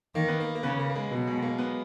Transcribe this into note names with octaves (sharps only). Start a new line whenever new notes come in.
D#3 A#3
B3
A#3
A#3
C#3 B3
A#3
A#3
G#3
B2 F#3
G#3
A#3
B3